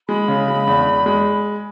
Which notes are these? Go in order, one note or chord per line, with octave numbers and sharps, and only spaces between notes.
G#3 B5
C#3
G#3
E2
E2
G#3